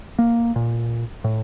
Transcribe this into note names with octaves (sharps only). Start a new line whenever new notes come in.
A#3
A#2
A2